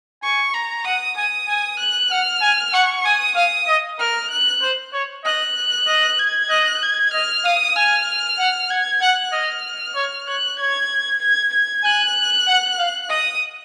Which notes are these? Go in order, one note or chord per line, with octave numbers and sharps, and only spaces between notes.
G#5 C#6
A#5
F#5 D#6
G#5 D#6
G#5
F#6
F#5 F6
G#5
F#5 C#6
G#5 D#6
F5 D#6
D#5
A#4 F6
F#6
C5
C#5
D#5 F#6
D#5
G#6
D#5 F#6
G#6
D#5 F6
F5 D#6
G#5 F6
F#5
F#5 G#6
F#5 F#6
D#5 F6
C#5
C#5 F#6
C#5 G#6
G#6
G#6
G#5 F#6
F#5
F5
D#5 D#6